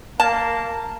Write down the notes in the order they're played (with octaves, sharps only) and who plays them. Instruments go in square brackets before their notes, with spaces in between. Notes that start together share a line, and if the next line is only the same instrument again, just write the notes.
[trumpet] A#3 [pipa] A5